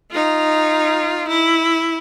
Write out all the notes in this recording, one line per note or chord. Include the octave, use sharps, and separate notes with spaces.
D#4 F4
E4